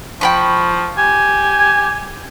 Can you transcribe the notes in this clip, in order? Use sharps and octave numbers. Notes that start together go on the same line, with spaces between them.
F3 G5 B5 C#6
G4 G#5